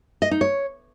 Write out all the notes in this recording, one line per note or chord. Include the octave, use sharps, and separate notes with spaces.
D#5
D#4
C#5